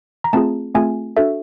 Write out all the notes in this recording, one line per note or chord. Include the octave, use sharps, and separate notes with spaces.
A#5
A3 C4 F4 G#4 A5
A3 C4 F4 G#4 G#5
D4 F#4 A4 E5